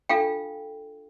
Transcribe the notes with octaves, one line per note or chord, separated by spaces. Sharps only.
D4 F4 A4 F5 G5